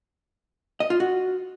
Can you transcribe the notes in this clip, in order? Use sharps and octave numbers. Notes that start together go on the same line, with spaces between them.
D#5
F4
F#4